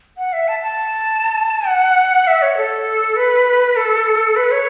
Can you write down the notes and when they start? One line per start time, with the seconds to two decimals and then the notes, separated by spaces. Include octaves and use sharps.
0.18 F#5
0.33 E5
0.48 A5
0.63 A5
1.67 F#5
2.27 E5
2.42 C#5
2.57 A4
3.16 B4
3.76 A4
4.36 B4
4.51 C#5